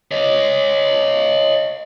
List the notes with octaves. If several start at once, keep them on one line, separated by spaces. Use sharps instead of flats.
C#5 D#5